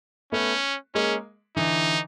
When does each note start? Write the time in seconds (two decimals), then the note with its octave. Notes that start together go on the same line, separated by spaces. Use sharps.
0.32 A3 B3 C#4
0.94 G#3 A#3 C#4
1.56 D3 E3 D#4